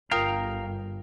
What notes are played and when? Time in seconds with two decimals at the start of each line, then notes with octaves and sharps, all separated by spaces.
0.11 G1 F4 A#4 F5 G5 A#5 D#6